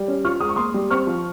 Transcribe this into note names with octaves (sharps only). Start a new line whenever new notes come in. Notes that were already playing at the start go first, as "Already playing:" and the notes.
Already playing: G3
C#4
F4 C#6 F6
G#3 D#6
C#6
A#3 C6 D#6
G3
C4 C#6 F6
F3